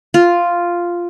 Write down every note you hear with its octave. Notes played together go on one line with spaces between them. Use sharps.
F4